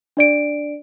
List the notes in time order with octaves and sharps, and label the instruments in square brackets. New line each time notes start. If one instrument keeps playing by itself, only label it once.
[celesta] D4 D5 D7